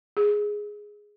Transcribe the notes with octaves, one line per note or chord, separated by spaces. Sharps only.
G#4